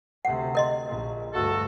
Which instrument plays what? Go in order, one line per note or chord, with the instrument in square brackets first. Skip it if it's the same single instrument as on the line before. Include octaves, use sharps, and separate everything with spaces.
[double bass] D2 C3 [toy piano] F#5
[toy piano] A#4 D#5 C6
[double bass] A#1 A#2
[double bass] D2 G2 [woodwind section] F#4 A4